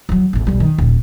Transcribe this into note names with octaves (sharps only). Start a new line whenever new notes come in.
E3 F#3
A1 E2
B1 G3
D#3
D#1 A#2